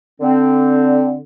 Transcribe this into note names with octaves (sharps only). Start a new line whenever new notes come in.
D3 C4